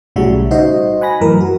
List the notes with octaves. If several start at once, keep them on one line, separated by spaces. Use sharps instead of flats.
B1 A2 C#3 G3 F#4 E5
D#4 F#4 C5 D#5 C6
F#5 G#5 B5 A#6
F#2 A2 E3 A#4
F#4